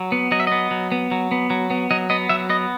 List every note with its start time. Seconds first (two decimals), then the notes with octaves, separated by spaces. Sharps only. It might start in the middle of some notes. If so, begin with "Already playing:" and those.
Already playing: F#3
0.12 B3
0.32 F#3 D#5
0.40 E5
0.47 B3 D#5
0.71 F#3
0.92 B3
1.11 F#3
1.31 B3
1.50 F#3
1.70 B3
1.91 F#3 D#5
2.10 B3 D#5
2.29 F#3 E5
2.50 B3 D#5